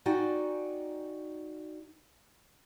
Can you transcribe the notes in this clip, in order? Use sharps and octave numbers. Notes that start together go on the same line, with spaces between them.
D#4 F#4 D5 G5 G#5